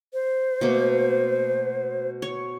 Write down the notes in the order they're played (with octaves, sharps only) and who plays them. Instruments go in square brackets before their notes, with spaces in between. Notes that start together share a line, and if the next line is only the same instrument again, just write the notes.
[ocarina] C5
[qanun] B2 A3 A#3
C#5